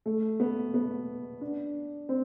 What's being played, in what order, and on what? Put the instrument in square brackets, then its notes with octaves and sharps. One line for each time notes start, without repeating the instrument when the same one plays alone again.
[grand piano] A3
B3
B3
D4
C4